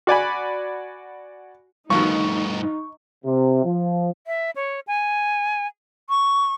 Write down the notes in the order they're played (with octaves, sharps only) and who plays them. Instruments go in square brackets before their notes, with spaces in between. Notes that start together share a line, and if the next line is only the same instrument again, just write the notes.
[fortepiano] F#4 D5 G#5 B5
[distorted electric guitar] G2 A3 [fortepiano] B2 D#3 F3 [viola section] D#4 [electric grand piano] C#6
[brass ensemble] C3
F3
[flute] E5
C#5
G#5
C#6